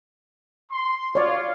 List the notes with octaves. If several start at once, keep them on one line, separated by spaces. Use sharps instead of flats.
C6
F4 C#5 D5